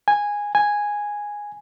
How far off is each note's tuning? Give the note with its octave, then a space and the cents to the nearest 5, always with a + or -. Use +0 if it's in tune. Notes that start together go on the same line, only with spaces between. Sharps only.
G#5 -10
G#5 -5